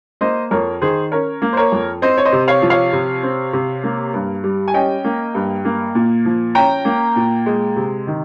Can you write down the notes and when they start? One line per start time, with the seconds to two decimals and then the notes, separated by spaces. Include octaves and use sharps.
0.21 A#3 C5 D#5
0.51 F2 A#4 C#5
0.81 D#3 G#4 C5
1.12 C#4 A#4 C#5
1.42 A#3
1.53 C5
1.57 A#4 C#5
1.72 F2
2.02 C4 C5 D#5
2.18 C#5
2.25 C5 D#5
2.32 C3
2.48 C#5 F5
2.62 F3
2.70 C#5 F5
2.93 C3
3.23 C4
3.53 C3
3.84 A#3
4.14 G2
4.44 G3
4.68 G#5
4.74 C#4 D#5 G5
5.05 A#3
5.35 G2
5.65 A#3
5.95 A#2
6.25 F3
6.55 C#4 G5 A#5
6.85 A#3
7.16 A#2
7.46 G#3
7.76 C3
8.07 D#3